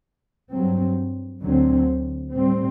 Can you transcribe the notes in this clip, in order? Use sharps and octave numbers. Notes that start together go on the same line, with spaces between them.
G2 F#3 C4
D2 D3 F#3 C4
A2 G3 C4